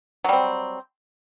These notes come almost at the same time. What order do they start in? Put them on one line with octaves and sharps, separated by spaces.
F#3 G3 C4